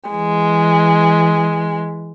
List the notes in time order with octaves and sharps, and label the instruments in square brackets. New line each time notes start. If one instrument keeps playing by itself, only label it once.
[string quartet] E3 G#3